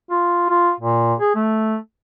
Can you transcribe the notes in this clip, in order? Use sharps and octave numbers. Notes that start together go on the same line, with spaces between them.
F4
F4
A#2
G#4
A3